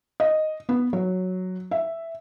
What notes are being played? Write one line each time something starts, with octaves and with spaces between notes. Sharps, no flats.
D#5
B3
F#3
E5